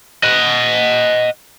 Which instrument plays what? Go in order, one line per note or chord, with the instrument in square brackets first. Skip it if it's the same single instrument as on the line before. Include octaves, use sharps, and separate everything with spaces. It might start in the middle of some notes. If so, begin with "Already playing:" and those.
[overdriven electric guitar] D#5 F#5